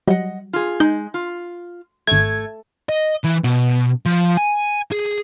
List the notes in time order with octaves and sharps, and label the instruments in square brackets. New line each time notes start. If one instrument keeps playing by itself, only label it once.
[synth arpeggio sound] F#3 G3 [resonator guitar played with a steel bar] D#5 F#5
[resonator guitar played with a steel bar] F4 G#4
[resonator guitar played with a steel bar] G#3 [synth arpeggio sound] D#4 G6
[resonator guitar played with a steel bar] F4
[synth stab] G#1 G#6 [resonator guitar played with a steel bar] A3
[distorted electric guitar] D#5
E3
B2
F3
G#5
G#4